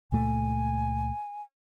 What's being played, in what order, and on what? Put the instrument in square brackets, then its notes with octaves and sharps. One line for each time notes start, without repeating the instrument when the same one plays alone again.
[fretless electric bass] C#2 A#2 A3 [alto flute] G#5